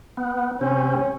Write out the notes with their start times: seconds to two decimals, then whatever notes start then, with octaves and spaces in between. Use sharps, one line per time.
0.17 B3
0.61 C3 C4 C#4